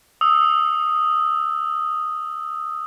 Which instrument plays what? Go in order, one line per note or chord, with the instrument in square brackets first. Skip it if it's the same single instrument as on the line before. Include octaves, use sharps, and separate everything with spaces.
[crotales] D#6 E6